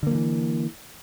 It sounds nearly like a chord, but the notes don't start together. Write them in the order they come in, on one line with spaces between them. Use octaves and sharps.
D3 A#3 F3 E3